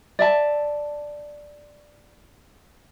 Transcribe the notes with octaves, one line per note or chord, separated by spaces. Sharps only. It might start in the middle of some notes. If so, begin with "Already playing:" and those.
D5 E5 A5